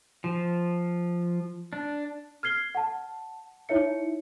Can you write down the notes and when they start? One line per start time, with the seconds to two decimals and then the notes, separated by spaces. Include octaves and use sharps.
0.24 F3
1.73 D4
2.43 F6 G#6 C7 G7
2.75 F#5 A5
3.69 D#4 E4 C#5 E5 C#7